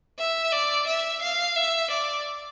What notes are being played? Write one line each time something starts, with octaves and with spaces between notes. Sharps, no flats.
E5
D5
E5
F5
E5
D5